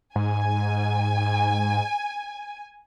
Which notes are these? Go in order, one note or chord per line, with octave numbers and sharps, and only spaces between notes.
G#2 G#5